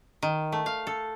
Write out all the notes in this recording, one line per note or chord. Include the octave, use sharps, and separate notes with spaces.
D#3
A3
F5
A4